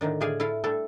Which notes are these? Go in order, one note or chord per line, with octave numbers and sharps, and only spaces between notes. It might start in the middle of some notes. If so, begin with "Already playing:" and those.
A2 D3 D#3 D4
A2 D3 G#4 D5 F5 G#5
E4 F4 A4 F5
G3 A3 D4 A4